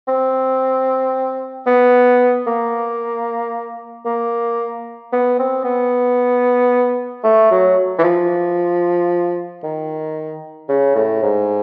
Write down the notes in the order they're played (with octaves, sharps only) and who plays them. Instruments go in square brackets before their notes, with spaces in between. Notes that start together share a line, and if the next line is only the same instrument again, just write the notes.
[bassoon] C4
B3
A#3
A#3
B3
C4
B3
A3
F#3
E3
F3
D#3
C#3
A2
G#2